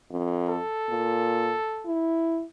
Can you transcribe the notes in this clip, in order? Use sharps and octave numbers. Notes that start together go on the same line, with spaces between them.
F2
A4
A#2
E4